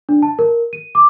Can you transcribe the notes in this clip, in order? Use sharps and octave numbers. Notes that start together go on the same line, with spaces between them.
D4
A5
A#4
D#7
D6